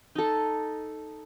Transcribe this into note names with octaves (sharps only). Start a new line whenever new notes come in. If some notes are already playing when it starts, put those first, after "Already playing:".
D#4 A4